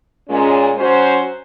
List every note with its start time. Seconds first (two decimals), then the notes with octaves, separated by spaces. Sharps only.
0.28 A#2 G#3 C#4
0.78 F#3 C#4 F#4 C5